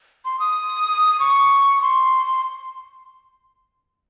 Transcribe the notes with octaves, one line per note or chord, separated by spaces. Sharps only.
C6
D#6
C#6
C6